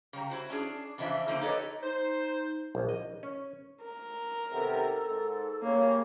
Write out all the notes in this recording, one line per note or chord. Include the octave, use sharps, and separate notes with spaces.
C#3 G3 A#5
E4 F#4 C5
C#4 D4 G#4
F2 C#3 E3 F3 D4 E5
D3 F3 A#3 D#4 C5
D#4 G4 A4 B4 C#5 D#5
D#4 C5
A#1
D#5
C#4
A#4
C3 D#3 B3 A4
G#2
G2 C#3 A#3 C#5